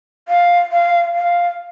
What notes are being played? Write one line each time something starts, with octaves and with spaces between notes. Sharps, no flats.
F5
F5
F5